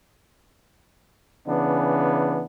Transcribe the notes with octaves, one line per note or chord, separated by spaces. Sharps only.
C#3 E3 B3 D4